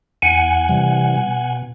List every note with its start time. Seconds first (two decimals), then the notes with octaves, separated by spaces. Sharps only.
0.22 E2 F#5 G#5
0.69 C3 E3 G3
1.16 B2